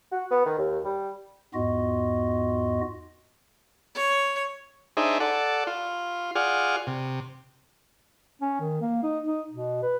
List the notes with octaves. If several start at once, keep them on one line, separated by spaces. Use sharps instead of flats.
F#4
B3
D#3
D#2
G3
E2 G#2 B3 F4 F#4 D#5
C#5
D4 D#4 G#4 C5 E5
A4 D5 F#5
F4
F4 G#4 D5 F#5 F6
C3
C#4
D#3
A#3
D#4
D#4
B2
B4